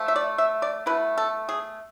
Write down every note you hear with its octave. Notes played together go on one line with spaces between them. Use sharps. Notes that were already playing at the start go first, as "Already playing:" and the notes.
Already playing: F3 A3
E5
D5
E5
D5
B2 A3 E4 B4
A4
G#4